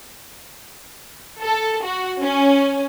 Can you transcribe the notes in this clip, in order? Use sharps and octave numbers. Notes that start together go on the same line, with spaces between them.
A4
F#4
C#4